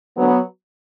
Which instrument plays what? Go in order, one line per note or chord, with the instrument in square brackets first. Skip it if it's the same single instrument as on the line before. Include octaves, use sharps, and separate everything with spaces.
[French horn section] D2 D3 F#3 B3